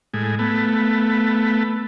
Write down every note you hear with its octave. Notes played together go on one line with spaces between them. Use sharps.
A2 G#3
A3 B3